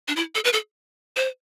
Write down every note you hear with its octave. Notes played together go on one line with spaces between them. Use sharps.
D4
E4
A4
B4
A4
C5